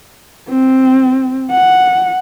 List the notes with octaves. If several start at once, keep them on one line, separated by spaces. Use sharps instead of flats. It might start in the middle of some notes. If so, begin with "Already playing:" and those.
C4
F#5